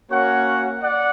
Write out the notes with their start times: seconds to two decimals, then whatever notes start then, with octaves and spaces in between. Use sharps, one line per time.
0.10 A#3 C#4 F#4 C#5 F#5
0.81 D5 F#5